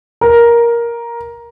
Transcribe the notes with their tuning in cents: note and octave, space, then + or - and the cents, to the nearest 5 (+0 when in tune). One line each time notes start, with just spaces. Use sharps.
A#4 +10